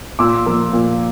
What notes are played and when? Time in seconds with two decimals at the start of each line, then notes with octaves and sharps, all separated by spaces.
0.19 A#2 D6 E6
0.46 F3 A#3
0.73 A#2